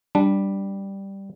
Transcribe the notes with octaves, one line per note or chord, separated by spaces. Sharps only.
G3 D4